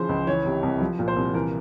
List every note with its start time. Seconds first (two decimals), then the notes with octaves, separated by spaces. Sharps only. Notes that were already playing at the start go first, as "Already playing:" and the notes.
Already playing: C#3 E3 F3 C5
0.09 C#2
0.27 E3 C#5
0.45 C3
0.63 C2
0.80 F3
0.99 A#2
1.08 C5
1.16 C2
1.34 E3 A#4